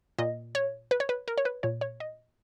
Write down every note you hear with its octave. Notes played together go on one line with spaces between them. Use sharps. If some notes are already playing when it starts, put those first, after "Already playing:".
A#2 D#5
C#5
B4
C#5
B4
A#4
C#5
B4
A#2 C#5
C#5
D#5